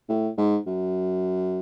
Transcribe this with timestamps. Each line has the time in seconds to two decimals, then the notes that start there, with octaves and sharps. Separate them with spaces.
0.09 A2
0.38 G#2
0.67 F#2